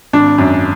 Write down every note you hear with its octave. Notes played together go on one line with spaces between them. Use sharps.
G#1 D4
F#2